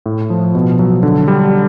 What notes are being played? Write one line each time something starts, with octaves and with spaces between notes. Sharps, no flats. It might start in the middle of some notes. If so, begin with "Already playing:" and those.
A2
F3
B2
F#3
D3
G3